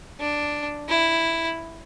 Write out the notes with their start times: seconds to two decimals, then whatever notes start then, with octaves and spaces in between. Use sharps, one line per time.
0.20 D4
0.89 E4